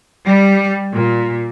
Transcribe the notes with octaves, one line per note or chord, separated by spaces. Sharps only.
G3
A#2